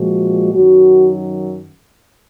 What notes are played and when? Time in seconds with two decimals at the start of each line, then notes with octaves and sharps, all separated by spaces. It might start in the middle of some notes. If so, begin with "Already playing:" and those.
Already playing: A#2 F3 G#3 F#4
0.53 F#2 D#3 F#3 F#4